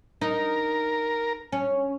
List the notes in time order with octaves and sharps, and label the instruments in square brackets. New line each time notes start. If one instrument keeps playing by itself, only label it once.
[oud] D#4 [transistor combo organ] A#4
[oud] C#4